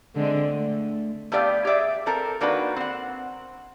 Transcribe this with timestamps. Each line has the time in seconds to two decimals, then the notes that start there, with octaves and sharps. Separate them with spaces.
0.16 D3 G#3 C4
0.51 A3
1.32 A3 B3 G4 D5 E5 F5
1.65 G4 G#4 D5 E5
2.06 C4 A4 A#4
2.41 D#3 A#3 D4 F#4 B4
2.76 C4 F#5